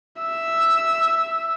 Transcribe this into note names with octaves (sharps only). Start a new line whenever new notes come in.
E5 E6